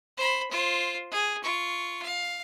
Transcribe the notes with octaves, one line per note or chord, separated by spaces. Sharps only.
C5 B5
F4 C5
G#4
F4 C#6
F5